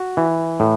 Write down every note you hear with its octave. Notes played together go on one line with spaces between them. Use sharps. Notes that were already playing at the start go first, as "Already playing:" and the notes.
Already playing: F#4
E3
A2